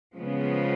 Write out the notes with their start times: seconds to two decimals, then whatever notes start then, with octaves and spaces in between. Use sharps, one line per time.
0.15 C#3 F3 G#3 B3